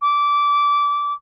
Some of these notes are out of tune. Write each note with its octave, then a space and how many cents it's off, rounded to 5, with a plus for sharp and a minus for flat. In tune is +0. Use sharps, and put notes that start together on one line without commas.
D6 -20